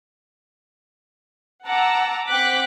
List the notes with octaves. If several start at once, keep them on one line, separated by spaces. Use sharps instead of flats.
F#5 A5 A#5 D6 E6
C4 F#5 G5 D6 F#6 B6